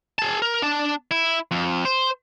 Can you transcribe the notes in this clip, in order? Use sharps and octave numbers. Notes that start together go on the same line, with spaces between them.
G#4 A5
A#4
D4 A5
E4
F2
C5